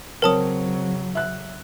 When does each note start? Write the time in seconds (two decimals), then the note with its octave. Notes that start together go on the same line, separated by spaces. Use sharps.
0.22 C#3 F#3 C4 A#4 C#5 A5 D#6
1.15 E5 F#6